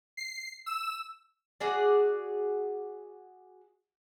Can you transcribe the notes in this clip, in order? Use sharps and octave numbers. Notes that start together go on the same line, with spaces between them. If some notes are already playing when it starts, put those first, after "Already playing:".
C7
E6
F#4 G#4 D5